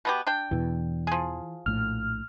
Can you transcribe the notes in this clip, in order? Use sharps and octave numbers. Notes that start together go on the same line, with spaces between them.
B2 B3 G4
D4 G5
E2 B2 E3
F3 G#4
A#1 A2 F6